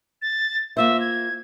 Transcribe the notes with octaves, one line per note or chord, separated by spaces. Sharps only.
A6
A#3 F4 C5 E5
G#6